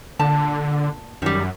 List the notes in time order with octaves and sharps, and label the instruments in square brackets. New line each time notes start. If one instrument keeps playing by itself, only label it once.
[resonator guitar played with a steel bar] A#2 A5 [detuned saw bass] D3
[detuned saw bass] F#2 [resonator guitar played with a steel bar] D#3 G3